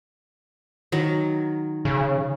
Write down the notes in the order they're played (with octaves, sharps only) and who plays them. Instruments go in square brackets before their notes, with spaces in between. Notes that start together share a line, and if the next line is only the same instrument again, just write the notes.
[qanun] D#3 F#3
[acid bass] C#3